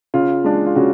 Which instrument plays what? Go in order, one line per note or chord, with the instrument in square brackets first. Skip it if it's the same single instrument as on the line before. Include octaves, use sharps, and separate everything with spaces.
[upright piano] C#3 F4
G#3 D4
F4
C#3 F#4